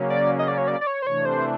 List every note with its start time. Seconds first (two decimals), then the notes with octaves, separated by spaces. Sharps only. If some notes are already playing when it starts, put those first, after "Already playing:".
Already playing: C#3 F#3 A#3 C#4
0.10 D5
0.39 D#5
0.48 D5
0.58 C#5
0.68 D5
0.81 D5
0.87 C#5
1.02 C5
1.06 C3 E3 A3 D4 C#5
1.25 C5